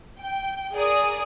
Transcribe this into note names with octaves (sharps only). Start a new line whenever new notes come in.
G5
G#4 A#4 D5 D#6